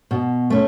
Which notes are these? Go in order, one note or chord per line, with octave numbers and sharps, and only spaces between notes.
B2
A3 C#4